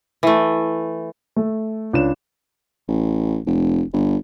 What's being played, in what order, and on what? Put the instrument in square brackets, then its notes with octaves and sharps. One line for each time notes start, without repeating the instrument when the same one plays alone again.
[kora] E3 A3
[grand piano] A3
C#2 D4 C#5 E7
[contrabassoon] A1
F1
G1